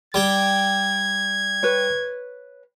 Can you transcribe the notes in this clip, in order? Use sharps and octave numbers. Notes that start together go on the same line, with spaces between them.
G3 G4 G5 G#6
B4 C#5